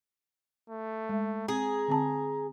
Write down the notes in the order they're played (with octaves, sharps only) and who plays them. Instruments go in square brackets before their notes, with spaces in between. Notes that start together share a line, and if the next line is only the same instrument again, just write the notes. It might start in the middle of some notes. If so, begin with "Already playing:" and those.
[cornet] A3
[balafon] G#3
[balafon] C4 [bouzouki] G#4 [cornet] A#5
[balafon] D3 C4 A5